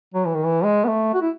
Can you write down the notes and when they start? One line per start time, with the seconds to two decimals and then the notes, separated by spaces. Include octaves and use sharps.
0.14 F#3
0.25 E3
0.35 D#3
0.45 E3
0.64 G#3
0.85 B3
0.88 A3
1.14 F#4
1.21 E4